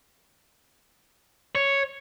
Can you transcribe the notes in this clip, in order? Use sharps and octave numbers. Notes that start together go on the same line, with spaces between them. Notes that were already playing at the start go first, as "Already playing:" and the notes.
C#5